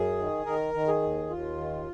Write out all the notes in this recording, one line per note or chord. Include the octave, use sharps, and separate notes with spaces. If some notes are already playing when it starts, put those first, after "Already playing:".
Already playing: F#2 G#4
D#3
D#3 A#4
D#3
G#4
D#2
D#2 F4
D#3